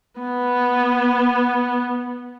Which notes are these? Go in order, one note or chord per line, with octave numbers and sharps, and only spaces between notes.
B3